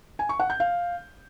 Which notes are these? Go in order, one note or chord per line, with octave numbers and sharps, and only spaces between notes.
G#5
C#6
F#5
G6
F5